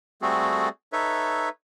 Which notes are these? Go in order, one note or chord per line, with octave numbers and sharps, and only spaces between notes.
G3 A3 C4 F#4 G#4 A4
D#4 A4 B4 C#5 E5